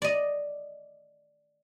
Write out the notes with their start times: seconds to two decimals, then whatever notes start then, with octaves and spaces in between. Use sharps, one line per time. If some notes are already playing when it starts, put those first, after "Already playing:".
0.02 D5 D#5